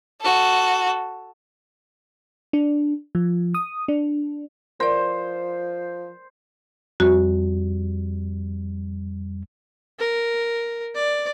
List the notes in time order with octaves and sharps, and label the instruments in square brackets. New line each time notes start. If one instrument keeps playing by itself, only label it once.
[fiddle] F#4 A4
[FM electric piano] D4
F3
D#6
D4
[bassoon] F3 [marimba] A#4 D5 [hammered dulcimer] C5
[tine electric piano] F2 G3 [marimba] F#4
[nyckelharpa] A#4
D5